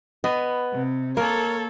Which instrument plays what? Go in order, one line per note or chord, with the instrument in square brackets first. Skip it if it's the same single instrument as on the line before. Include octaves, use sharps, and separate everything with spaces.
[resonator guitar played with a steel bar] B3 [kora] D#5
[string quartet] C3
[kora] A#3 [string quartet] A4 C#5 [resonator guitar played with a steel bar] A#4